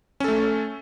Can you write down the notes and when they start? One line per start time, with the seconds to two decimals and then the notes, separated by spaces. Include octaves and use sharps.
0.20 C#4
0.24 A4
0.28 A3